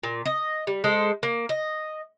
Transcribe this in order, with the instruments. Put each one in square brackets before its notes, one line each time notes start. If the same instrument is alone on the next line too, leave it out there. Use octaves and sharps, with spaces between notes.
[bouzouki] A#2
D#5
G3
G#3 A4 C5
A#3
D#5